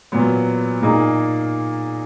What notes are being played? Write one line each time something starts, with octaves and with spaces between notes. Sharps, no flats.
A#2 F#3 B3
A#2 A#3 D#4 G#4